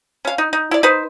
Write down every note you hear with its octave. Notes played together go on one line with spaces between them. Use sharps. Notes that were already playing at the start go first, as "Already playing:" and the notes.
C#4 F5
D#4
D#4
E4 D5
D#4 B4 C5